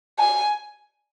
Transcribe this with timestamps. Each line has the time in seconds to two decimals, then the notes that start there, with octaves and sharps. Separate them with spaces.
0.19 G#5